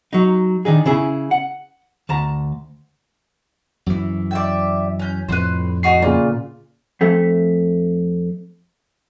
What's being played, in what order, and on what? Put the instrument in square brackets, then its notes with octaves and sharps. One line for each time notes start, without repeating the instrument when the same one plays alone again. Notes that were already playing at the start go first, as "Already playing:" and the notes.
[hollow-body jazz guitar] F#3 D#4
D#3 D4 D#4 G#4
C#3 E4 G#4
F#5
D2 A5 A#5
[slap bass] F#2 E3
[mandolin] D5 E5 G5
C#4 G6
[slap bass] F2 A2 [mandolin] B4 C5
[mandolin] D#4 F#4 G#4 [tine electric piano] C7
[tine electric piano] A#2 C#3 [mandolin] F4
[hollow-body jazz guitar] F2 A3